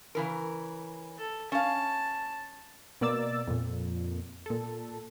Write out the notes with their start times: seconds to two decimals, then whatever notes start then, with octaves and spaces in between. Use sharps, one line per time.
0.15 C#3 E3 A#4
1.18 A4
1.52 C#4 F5 A5
3.01 B2 A#3 D5 E6 A6
3.47 F2 A#2
4.46 A#2 A4